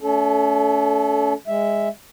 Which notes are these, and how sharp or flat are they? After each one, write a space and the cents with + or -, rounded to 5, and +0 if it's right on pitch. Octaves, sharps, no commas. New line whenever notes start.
A3 +0 C#4 +35 A4 -15
G#3 -15 E5 +0